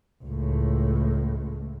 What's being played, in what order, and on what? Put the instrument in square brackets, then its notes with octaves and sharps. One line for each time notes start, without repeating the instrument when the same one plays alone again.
[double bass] C#2 A2